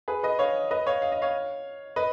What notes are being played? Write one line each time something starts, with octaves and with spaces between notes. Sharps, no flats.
G#4 B4
B4 D#5
C#5 F5
B4 D#5
C#5 F5
F5
D#5
C#5 F5
B4 D#5